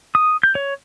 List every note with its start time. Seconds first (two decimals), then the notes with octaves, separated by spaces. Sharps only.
0.15 D#6
0.43 G6
0.55 C#5